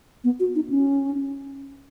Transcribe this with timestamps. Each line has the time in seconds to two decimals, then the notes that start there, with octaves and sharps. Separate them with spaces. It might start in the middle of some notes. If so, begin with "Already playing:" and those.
0.24 B3
0.40 F#4
0.55 D#4
0.70 C#4